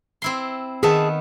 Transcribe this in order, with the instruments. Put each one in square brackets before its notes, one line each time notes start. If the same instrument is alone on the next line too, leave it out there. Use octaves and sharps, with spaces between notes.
[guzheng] C4 E4 C6
[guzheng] D#3 B3 E5 [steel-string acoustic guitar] G#4 A5